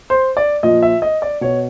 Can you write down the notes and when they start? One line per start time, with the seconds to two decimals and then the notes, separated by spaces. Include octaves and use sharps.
0.10 C5
0.37 D5
0.63 A#2 F3 D#5
0.83 E5
1.02 D#5
1.22 D5
1.41 B2 C#5